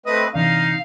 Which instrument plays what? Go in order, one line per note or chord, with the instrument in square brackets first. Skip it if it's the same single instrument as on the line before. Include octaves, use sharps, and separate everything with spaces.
[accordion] A3 C4 B4 [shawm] D#5
[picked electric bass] C3 E3 D4 [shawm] D#4 [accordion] F5